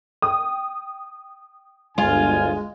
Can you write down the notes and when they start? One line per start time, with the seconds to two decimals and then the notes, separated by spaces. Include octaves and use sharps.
0.22 G5 D#6
1.98 G1 D2 G#3 F4 G#5